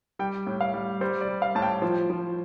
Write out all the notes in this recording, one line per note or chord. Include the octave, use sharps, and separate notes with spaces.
G3 G5
A2
F5
G3
G3 C5
D5
G3
F5
A2 A5
G5
F3
F3